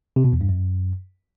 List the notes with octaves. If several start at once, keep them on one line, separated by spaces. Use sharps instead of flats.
C3
B2
E2
G2
F#2